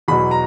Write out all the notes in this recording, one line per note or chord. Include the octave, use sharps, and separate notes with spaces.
E2 B2 F#3 B5
A#5